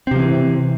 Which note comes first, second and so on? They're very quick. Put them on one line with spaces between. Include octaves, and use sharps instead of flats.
C4 C3 F3 E3